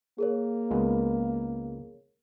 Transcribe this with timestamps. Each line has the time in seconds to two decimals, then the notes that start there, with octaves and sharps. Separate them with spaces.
0.18 A#3 G#4 A#4 C#5
0.71 C#2 G#3 B3